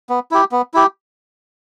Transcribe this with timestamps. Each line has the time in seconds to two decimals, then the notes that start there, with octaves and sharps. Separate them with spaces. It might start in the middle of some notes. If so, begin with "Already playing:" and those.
0.09 B3
0.31 E4 G4
0.52 B3
0.74 E4 G4